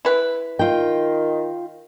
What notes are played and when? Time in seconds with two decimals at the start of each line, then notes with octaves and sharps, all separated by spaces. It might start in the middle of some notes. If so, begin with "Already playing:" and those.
0.05 E4 B4
0.59 D#3 F4 G5